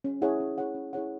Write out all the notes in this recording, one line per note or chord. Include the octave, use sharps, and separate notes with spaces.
C#4
E4 G#4 C#5 F#5
C#4
E4 G#4 C#5 F#5
C#4
E4 G#4 C#5 F#5